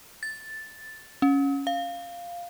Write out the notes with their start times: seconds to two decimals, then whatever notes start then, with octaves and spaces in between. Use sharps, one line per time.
0.23 A6
1.22 C#4
1.67 F5